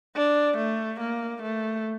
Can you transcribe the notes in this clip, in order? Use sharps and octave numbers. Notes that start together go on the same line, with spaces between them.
D4
A3
A#3
A3